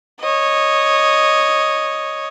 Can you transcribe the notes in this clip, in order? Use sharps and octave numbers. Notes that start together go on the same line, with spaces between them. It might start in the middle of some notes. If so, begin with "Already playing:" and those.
C#5 D#5